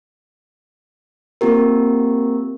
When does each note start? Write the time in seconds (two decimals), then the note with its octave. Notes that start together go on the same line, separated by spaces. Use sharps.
1.41 A#3 C4 F4 G4 A#4